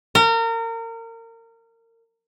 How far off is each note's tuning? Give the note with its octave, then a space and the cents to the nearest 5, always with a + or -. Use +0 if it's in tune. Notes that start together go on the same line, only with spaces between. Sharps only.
A#4 -30